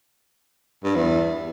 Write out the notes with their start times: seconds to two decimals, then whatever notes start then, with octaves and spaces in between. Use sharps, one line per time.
0.84 G2
0.95 E2